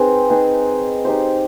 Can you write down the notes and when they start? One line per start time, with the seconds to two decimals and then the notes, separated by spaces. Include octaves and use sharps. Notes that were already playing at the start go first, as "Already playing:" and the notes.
Already playing: C4 D#4 G#4 B4
0.30 C4 D#4 G#4 B4
1.05 D#4 G4 C5